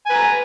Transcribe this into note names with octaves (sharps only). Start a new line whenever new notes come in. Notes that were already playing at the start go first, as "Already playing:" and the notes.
B4 G#5 A#5